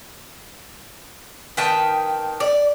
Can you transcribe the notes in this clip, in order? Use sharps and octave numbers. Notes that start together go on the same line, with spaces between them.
D#3 B4 G5 A5
D5